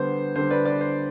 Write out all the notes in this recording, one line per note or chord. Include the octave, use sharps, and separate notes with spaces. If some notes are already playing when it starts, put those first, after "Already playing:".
Already playing: D3 G3 B3 C5
D3 G3 B3 C5
B4 D5
B4 D5
C5